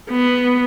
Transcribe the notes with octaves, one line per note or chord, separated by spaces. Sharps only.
B3